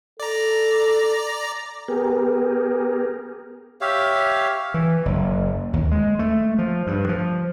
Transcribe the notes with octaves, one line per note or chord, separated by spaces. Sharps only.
A4 D5 A#5
B3 G4 G#4 A#4
G4 C#5 E5 F5
E3
F#1
D#2
G#3
A3
F3
G2
F3